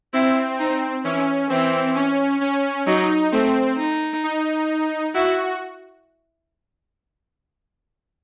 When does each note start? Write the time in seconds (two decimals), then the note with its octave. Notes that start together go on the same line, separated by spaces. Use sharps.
0.13 C4 E4
0.59 D#4
1.04 E3 C#4
1.49 E3 C4
1.95 C#4
2.41 C#4
2.86 F#3 D#4
3.32 A3 C4
3.78 D#4
4.23 D#4
5.14 E4 F#4